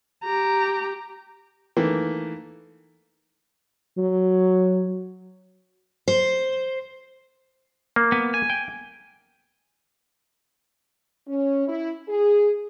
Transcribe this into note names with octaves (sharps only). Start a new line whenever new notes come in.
G4 A#5
D#3 E3 A3 A#3
F#3
C5
A#3
B3
G#5
G5
C#4
E4
G#4